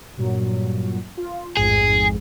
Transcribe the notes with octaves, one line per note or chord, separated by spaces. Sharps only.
G2 A#2 F#3
F4
A1 F2 G#2 G#4